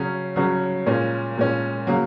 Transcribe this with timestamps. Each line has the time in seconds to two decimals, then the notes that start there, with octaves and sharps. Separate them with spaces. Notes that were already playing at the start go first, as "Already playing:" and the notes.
Already playing: C#3 F#3 C#4
0.36 C#3 F#3 C#4
0.86 A#2 G#3 C#4
1.37 A#2 G#3 C#4
1.87 C#3 F#3 A#3